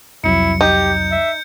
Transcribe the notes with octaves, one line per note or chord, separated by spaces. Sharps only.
C2 F2 F#3 E4 C#7
D#4 G4 G6
E5